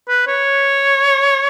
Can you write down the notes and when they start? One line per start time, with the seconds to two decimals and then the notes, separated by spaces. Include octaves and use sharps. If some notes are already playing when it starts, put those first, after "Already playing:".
0.09 B4
0.27 C#5